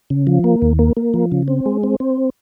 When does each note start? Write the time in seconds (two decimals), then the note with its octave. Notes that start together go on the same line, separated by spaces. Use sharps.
0.10 C#3
0.27 F3
0.44 A#3
0.62 D#2
0.79 A#3
0.97 A#3
1.14 F3
1.32 C#3
1.48 C4
1.66 G#3
1.83 C4
2.00 C4